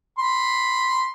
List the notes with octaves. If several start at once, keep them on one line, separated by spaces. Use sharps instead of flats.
B5 C6